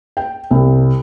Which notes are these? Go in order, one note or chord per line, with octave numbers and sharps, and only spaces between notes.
G5
C2